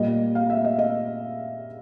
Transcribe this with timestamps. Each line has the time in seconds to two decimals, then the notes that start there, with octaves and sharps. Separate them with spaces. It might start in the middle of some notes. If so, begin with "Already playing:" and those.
Already playing: A#2 G3 A#3 D#5
0.35 F5
0.50 E5
0.64 D#5
0.79 D#5